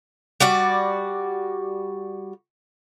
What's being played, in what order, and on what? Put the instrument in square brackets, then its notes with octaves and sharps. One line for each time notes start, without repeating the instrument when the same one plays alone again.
[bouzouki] G3 F#4 D5